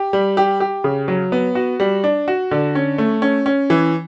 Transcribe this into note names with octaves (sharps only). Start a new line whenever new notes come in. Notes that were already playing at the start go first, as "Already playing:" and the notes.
Already playing: G4
G3
G4
G4
C#3
F#3
B3
F#4
G3
D4
F#4
D3
C#4
A3
C#4
C#4
E3